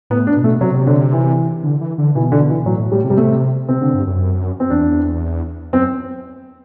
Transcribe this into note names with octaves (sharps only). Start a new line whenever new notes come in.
A2 B3
D4
B2
A3
C3 F#3
D3
E3
D3
E3
D3
B2 E3
D3
E3
A2 F#3
A2
A2 G3
C3
G3
A3
C3 C4
D3
G2
F#2
C4
E2 D4
F#2 C4